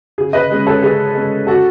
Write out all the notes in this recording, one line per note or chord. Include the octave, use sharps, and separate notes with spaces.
C#3 G#4
B4 D#5
G#3 C#4
A4 C#5
C#3 G#4 B4
G#3 C#4
F#4 A4